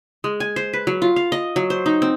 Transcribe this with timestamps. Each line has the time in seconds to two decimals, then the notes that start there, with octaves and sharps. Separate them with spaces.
0.24 G#3
0.40 G#5
0.56 C5
0.73 B4
0.87 F#3
1.02 F4
1.16 F5
1.32 D#5
1.56 F#3
1.70 C5
1.86 D#4
2.02 C4